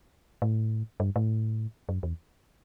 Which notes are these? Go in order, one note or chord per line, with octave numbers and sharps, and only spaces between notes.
A2
G2
A2
F#2
E2